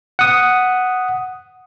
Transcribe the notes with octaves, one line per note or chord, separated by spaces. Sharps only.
F#5 D#6